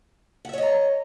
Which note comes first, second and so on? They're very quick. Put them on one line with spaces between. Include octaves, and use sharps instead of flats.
F#5 E5 C#5 D#5 A#5